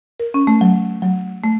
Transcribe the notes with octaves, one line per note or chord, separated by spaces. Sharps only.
A#4
C#4
A3
F#3
F#3
A3